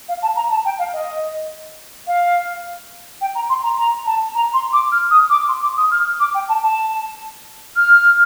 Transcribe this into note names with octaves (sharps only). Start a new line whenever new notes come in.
F5
A5
A#5
A5
G5
F5
D#5
F5
G5
A#5
C6
A#5
A#5
A5
A#5
C6
D6
F6
D#6
D6
C6
D6
D#6
F6
D6
G5
A5
A5
F6